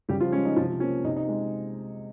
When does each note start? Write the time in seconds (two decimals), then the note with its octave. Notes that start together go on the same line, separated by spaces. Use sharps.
0.09 C#3 G3 G4
0.20 F3 F4
0.32 G#3 C#4
0.45 D#4
0.56 C3 F3 F4
0.80 F3 C#4
0.83 A#3
1.05 C3 D#4
1.16 D#4
1.29 G#3